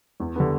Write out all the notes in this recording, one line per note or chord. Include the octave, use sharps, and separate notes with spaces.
E2
D3 G3 B3